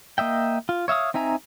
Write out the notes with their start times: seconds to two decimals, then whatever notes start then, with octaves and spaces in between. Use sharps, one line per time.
0.18 A#3 D#5 E5 G5
0.69 F4
0.88 C#5 E5 F5 D#6
1.14 C4 D#4 E5 G#5 A#5